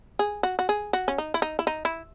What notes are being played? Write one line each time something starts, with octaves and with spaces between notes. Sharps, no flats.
G#4
F#4
F#4
G#4
F#4
C#4
D#4
E4
D#4
E4
D#4
E4